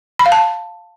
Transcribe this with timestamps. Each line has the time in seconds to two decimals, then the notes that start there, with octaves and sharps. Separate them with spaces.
0.19 B5
0.26 F5
0.32 A5